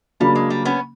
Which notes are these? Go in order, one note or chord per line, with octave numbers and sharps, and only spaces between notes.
C#3 F#3 G3 A#3 D4
G#3
G3
B3 C#4